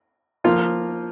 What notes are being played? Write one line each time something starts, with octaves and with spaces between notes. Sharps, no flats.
F3 A#3 F4